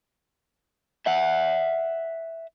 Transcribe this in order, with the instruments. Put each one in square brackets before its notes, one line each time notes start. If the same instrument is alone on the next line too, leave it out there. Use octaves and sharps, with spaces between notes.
[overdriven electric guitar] E5 F#5